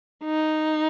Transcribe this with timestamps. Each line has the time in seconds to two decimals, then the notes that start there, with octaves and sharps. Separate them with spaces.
0.24 D#4